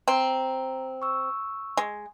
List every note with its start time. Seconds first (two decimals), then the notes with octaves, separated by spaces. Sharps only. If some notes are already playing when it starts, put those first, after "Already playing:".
0.08 C4 A#5
1.02 C#6 E6
1.77 G#3